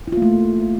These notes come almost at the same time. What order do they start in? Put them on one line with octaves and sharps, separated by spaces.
E4 F4 A#3 A3